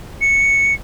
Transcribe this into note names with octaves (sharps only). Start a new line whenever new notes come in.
C#7